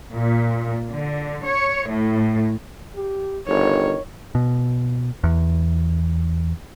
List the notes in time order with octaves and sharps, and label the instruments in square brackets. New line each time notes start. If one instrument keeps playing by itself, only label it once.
[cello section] A#2
D3
C#5
A2
[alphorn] G4
[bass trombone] G1 [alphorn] D#3 [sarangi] C#5
[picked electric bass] B2
E2